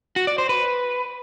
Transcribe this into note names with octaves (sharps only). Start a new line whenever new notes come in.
F#4
D5
C5
B4